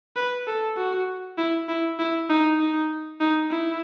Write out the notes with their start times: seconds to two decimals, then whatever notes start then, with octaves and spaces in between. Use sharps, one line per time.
0.16 B4
0.47 A4
0.77 F#4
1.38 E4
1.69 E4
1.99 E4
2.29 D#4
2.60 D#4
3.20 D#4
3.51 E4